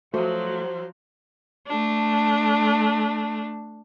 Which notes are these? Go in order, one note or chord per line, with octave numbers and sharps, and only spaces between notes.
F3 F#3 A3 F#4 C5 D6
A3 D4